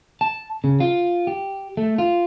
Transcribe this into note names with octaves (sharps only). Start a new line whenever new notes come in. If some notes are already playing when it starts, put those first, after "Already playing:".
A5
C#3
F4
G4
A3
F4